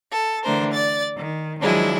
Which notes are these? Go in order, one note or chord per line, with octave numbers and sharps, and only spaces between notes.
A4
D3 E3 A3 D4 A#4 C5
D5 A6
D#3
D#3 F3 F#3 G#3 D4 E4